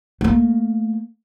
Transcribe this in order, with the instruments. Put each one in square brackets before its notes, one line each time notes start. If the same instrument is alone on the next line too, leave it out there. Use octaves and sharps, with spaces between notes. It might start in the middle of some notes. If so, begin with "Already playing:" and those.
[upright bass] A3 A#3